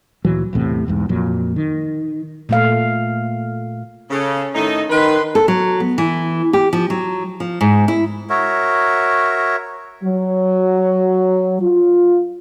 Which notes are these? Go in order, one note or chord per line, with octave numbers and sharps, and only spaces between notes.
D2 A#2 E3 F#3
B1 E2 A2 C3
B1 E2 G#2
F2 A#2 F#3
D#3
A#2 A3 F5
C#3 C#4 A4
A2 D#3 D#4 A4
D#3 B4 C6
A4
F#3
B3
E3
G4
F3
F#3
F3
G#2
E4
F#4 A#4 C#5 E5
F#3
F4